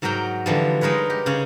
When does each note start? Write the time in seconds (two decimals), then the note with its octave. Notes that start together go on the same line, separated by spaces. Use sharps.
0.02 G#2 F#3 F#4 A#4 G5 A#5
0.46 D3 E3 F3 G3
0.81 G#3 D#4 A#4 B4 C#5
1.10 G4
1.26 C#3 C#4 G#4 C#5